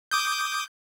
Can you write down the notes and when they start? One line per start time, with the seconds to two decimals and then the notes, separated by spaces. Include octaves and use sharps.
0.11 D6 D#6 G6